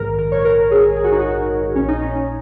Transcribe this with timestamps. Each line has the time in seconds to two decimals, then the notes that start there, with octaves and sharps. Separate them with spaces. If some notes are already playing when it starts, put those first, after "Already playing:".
Already playing: A#1 G#2 D#3 A#4
0.19 A#4
0.32 C#5
0.45 A#4
0.71 G#4
0.97 G#4
1.04 F#4
1.12 D#4
1.20 F#4
1.75 A#1 A#2 C#4
1.88 D#4
2.02 C#4